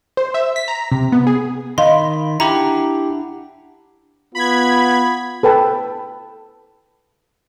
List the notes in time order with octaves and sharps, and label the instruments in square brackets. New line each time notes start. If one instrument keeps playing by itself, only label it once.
[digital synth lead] C5
E5
B6
A#5
C3
B3
G#4
[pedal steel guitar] D#3 B5 [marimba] D#5 F5 [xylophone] C6
[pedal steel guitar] D4 F#5 [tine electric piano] E4 G4 [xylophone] A#5
[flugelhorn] B3 [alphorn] F4 [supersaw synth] B5 G#6
[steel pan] A4 B4 G5 A5